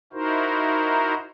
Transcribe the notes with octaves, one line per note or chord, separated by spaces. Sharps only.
D#4 E4 F#4 A#4 C5